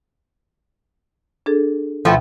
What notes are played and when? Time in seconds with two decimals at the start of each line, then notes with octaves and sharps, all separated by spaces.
1.46 D4 G#4 A4
2.05 D2 B2 F3 A3 E4 G5